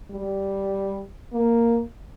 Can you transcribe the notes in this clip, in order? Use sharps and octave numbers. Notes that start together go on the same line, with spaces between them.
G3
A#3